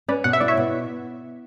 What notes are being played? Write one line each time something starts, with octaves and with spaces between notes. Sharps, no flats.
C#4 B4 D5
B2 F#5
E5
E4 D5
C#5 E5
B2